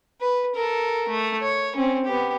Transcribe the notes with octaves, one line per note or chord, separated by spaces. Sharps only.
B4
A4 A#4
A3
C#5
C4 C#4
B3 G4